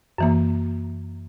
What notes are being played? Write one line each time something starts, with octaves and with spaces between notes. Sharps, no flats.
F#2 E3 A#3